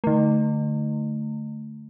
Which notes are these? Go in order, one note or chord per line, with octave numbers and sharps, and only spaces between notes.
D3 A3